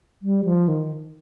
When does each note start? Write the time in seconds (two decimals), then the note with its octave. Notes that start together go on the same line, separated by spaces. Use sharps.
0.22 G3
0.45 F3
0.68 D#3